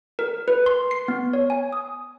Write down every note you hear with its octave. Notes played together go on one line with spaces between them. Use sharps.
A#4
B4
C6
C7
B3
C#5
G#5
D#6